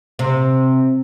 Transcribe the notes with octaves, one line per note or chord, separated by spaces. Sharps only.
C3